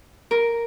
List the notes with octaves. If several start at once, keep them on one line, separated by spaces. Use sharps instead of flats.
A#4